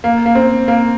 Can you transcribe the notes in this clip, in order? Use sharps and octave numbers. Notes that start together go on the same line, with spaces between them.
A#3
A#3
C4
A#3